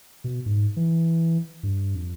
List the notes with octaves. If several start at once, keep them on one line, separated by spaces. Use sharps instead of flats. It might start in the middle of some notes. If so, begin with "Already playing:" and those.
B2
G#2
E3
G2
F2